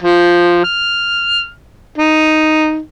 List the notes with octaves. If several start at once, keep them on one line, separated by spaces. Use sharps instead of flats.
F3
F6
D#4